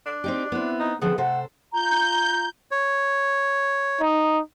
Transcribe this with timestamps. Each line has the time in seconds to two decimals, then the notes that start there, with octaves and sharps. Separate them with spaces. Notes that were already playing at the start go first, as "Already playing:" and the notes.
0.06 D4
0.24 C4 D#4 G4
0.52 B3 C4 E4
0.80 D#4
1.01 D3 F3 B3 C4 G#4
1.18 C3 A3 A4 C5 F#5
1.73 F4 A#5 G6
2.71 C#5
4.00 D#4